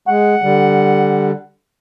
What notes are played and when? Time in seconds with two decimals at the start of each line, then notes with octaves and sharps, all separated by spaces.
0.08 G#3 F#5
0.42 D3 G3